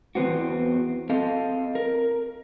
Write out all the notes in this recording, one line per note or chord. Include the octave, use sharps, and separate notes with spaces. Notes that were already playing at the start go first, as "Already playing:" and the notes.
E2 C3 B3 C4 F#4
C4 A4 D#5 F5
A#4